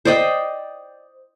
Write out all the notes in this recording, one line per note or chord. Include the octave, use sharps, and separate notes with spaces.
C5 D5 D#5 G5